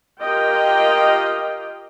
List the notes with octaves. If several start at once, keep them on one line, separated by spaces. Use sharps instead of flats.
F4 G4 A#4 D#5 G5